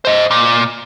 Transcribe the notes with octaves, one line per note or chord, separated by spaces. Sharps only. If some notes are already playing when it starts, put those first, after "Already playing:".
C5 D#5
A#2